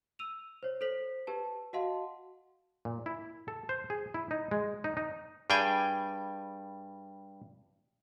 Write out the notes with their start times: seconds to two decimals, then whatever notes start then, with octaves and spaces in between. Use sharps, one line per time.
0.19 E6 D#7 F7
0.63 C5 C#5
0.81 A4 C5 C#5 B6 F#7
1.27 G4 B4 A5
1.73 F#4 D#5 F5 F#5 A5 C6
2.85 A#2
3.06 E4
3.48 A4
3.69 C5
3.90 G#4
4.14 E4
4.31 D#4
4.51 G#3
4.84 D#4
4.97 D#4
5.50 G2 G3 G#4 G5 G#5